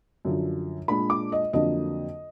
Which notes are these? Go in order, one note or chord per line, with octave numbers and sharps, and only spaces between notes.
F#2 D3 F3
A#2 G#3 D4 B5
D6
D#5
F2 D3 F#3 A#3 D4 D#5